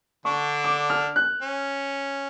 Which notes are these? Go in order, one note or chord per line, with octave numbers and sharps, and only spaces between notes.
D3 D4 C#6
D6
F6
F#6
C#4